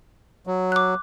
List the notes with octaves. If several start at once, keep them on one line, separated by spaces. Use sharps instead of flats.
F#3
D6 F#6